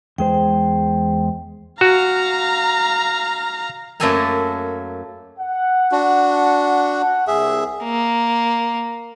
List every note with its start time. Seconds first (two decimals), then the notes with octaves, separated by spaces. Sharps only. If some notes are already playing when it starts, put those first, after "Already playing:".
0.18 E2 G#3 C5 G5
1.81 F#4 F5 A#5
4.00 F#2 A3 A#3 A4 G#5 A#5
5.39 F#5
5.92 D4 F#4
7.27 C2 G#4 E5
7.84 A#3